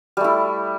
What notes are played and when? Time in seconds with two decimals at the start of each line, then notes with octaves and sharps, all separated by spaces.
0.17 G3
0.21 A3
0.24 E4